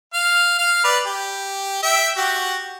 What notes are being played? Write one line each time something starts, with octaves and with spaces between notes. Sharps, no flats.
F5
F5
B4 D5
G4
E5 G5
F#4 G4